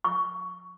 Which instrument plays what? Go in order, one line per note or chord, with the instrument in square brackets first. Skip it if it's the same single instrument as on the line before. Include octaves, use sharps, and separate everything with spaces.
[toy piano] C#6